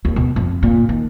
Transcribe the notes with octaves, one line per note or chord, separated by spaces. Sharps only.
D#2
B2
F2
A#2
D#3